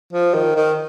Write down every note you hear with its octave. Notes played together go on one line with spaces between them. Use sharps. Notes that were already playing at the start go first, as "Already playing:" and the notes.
F3
D#3
D#3